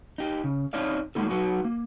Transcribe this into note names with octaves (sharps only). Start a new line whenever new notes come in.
D#4 G4
C#3
C4 D#4 C#5 D5 F5
F#3 G#3 A#3 D#4 A4
F#3 D#4 F#4 B4
A#3